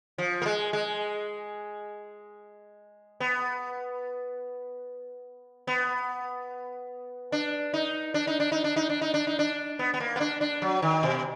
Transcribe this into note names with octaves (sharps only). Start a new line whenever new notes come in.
F3
A#3
G#3
G#3
B3
B3
D4
D#4
D4
D#4
D4
D#4
D4
D#4
D4
D#4
D4
D#4
D4
B3
B3
A#3
B3
D4
D4
F#3
D#3
B2